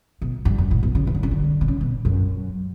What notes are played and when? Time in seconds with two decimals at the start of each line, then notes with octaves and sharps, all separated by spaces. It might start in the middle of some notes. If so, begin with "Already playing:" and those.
0.22 B2
0.45 G2
0.58 F#2
0.71 A2
0.83 B2
0.95 C#3
1.07 E3
1.15 D3
1.23 C#3
1.31 D3
1.61 B2
1.68 C#3
1.81 B2
2.05 F#2